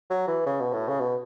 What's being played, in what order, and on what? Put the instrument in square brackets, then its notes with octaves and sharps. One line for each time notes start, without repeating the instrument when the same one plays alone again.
[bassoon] F#3
E3
C#3
B2
A2
C#3
B2